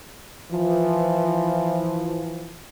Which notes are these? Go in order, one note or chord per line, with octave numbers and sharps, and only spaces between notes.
E3 F3